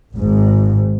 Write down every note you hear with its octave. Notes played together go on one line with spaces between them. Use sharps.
G#1 G#2